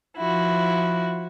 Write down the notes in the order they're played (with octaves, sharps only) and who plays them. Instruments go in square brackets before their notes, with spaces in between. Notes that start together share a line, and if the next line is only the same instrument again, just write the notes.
[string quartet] F3 E4 F#4